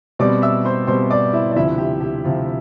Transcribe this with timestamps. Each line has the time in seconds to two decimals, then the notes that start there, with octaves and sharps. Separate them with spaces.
0.19 B2 G3 C4 D5 D6
0.42 E5 E6
0.65 C5 C6
0.87 B2 G3 C4 C5 C6
1.11 D5 D6
1.33 E4 E5
1.51 D5
1.56 D2 C3 F3 E4 E5
1.78 G4
2.01 G4
2.24 D2 C3 F3 F4